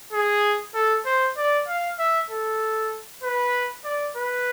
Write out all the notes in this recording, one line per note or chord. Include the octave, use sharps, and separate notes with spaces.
G#4
A4
C5
D5
F5
E5
A4
B4
D5
B4